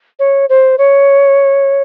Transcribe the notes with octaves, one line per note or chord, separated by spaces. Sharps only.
C#5
C5
C#5